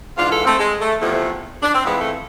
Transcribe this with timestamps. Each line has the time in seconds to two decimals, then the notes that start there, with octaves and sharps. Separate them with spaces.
0.17 G#2 E3 D4 F4
0.31 F4 A4
0.45 A3 C4
0.59 G#3
0.81 A3
1.01 E2 C3 F3 A3
1.63 D4
1.74 C4
1.85 F2 E3 G#3 B3
1.99 A3